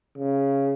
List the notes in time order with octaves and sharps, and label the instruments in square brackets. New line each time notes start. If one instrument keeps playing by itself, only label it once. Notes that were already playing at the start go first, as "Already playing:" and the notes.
[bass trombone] C#3